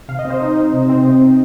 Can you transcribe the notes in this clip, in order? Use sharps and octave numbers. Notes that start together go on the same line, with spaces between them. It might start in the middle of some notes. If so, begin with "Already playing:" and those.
C3 F5
D#5
C4
C5
D#4 D#5
D#4
C3
C4
C3
C4